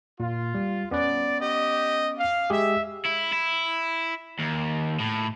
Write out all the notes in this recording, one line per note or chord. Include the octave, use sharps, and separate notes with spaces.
A#2 F4
G3
B3 C#4 B4 D5
G4 D#5
F5
G#3 G4 G#4 E5
E4
E4
D#2
A2